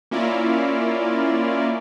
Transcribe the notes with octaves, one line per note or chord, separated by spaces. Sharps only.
A#3 C#4 E4 F4 A#4 D5